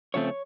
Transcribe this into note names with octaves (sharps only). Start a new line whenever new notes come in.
C#3 F3 A3 C4 C#5